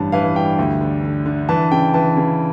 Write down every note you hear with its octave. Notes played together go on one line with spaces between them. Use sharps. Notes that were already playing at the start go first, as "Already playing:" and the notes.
Already playing: A1 G2 A5
E3 F5
G2 G5
D2
D3
D3
D3
E3 A5
C#3 G5
E3 A5
C#3